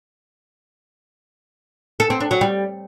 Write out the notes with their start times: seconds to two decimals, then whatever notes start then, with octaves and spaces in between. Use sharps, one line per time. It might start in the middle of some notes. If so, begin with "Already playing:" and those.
2.00 A4
2.10 C4
2.20 D4
2.31 F#3
2.41 G3